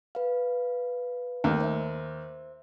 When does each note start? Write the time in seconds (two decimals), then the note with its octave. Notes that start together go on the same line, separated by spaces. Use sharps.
0.15 B4 F5
1.44 D#2 A3
1.61 C5 E5